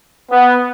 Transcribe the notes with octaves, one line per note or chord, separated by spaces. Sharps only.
B3